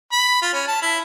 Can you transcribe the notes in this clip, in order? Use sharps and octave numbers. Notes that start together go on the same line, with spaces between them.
B5
F4
C#4
A5
E4